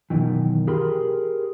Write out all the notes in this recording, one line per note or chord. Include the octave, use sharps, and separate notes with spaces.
F#2 B2 D#3 E3
G4 G#4 A#4 B5 C6